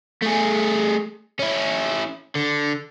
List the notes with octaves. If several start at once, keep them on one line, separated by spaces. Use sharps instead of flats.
A3 G#4
C#4 E4
D3